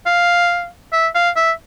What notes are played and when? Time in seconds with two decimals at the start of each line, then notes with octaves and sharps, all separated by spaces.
0.06 F5
0.93 E5
1.15 F5
1.36 E5